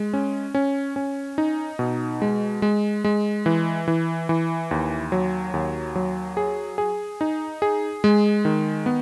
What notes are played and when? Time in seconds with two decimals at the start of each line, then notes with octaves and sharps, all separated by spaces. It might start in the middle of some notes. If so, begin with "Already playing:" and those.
Already playing: G#3
0.13 C#4
0.55 C#4
0.96 C#4
1.38 D#4
1.79 B2
2.22 G#3
2.62 G#3
3.04 G#3
3.46 E3
3.88 E3
4.29 E3
4.71 D#2
5.12 F#3
5.54 D#2
5.95 F#3
6.37 G#4
6.78 G#4
7.21 D#4
7.62 G#4
8.04 G#3
8.45 D#3
8.86 B3